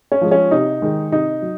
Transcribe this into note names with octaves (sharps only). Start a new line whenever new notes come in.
C#4
F3 G#3
C#4
C3 D#4
D#3 G#3
C3 D#4
F#3